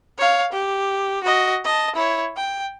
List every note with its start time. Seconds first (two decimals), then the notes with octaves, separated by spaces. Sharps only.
0.18 C#5 F5
0.52 G4
1.23 F#4 D#5
1.65 D#5 A5
1.95 E4 C#5
2.36 G5